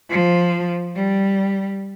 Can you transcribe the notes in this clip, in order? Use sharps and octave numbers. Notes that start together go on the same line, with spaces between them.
F3
G3